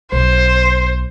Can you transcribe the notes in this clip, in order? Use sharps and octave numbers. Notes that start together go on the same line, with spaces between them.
B1 C5